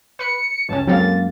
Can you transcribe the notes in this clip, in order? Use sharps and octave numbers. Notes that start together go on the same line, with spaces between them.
B4 B5 C#7
C#2 G2 C#4 A5
F#2 F#3 G#3 A#3 C4 A4 F5 A6